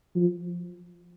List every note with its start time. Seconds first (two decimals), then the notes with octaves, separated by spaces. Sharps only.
0.16 F3